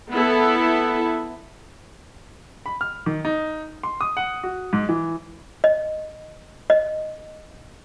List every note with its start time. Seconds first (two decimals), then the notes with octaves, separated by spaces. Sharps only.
0.11 B3 E4 A4
2.66 B5
2.81 F6
3.06 D#3
3.25 D#4
3.83 C6
4.01 D#6
4.17 F#5
4.44 F#4
4.73 G#2
4.89 E3
5.64 D#5
6.70 D#5